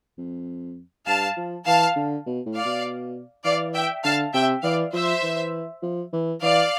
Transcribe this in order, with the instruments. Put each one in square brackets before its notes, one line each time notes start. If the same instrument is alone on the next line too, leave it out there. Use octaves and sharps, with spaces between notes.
[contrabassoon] F2
[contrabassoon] G2 [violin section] F5 A5
[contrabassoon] F3
[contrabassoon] E3 [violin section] F5 A5
[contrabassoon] D3
B2
A2
[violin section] D5 F5
[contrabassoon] B2
[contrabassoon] E3 [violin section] D5 F5
[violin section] E5 G5
[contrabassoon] D3 [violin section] F5 A5
[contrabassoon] C3 [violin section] E5 G5
[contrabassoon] E3 [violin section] D5 F5
[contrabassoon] F3 [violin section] C5 E5
[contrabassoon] E3
F3
E3
[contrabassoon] E3 [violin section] D5 F5